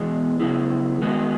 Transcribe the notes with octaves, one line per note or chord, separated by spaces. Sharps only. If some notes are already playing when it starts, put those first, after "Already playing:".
Already playing: E2 B2 G#3 B3
C#3 F#3 B3 E4 G#4
D#3 G#3 B3 F#4